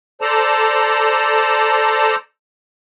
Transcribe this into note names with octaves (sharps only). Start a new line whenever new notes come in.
A4 C5 D5 A5 A#5